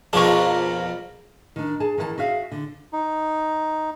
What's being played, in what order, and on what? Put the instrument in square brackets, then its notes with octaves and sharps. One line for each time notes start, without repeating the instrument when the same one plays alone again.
[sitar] F2 A#4 [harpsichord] B2 F3 D4 [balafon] G#4 [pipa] A5 C#6
[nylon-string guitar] D#3 D4
G#4 A5
D#3 E3 F5 A5
F#4 G#4 E5 F5
D3
[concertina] D#4